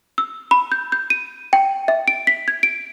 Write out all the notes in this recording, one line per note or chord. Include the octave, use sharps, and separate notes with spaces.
E6
B5
G6
G6
D#7
G5
E5
D7
B6
G#6
D7